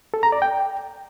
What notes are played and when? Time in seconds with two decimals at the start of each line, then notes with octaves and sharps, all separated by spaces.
0.14 A4
0.23 A#5
0.32 D5
0.42 G5